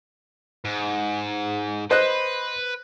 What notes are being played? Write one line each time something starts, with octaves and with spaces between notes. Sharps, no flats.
G#2
B4 C5 D#5 F#6